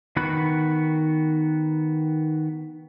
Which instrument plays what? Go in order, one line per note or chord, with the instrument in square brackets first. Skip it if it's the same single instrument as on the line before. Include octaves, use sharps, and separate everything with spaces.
[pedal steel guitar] D#3 B3 F#4 B5 F#6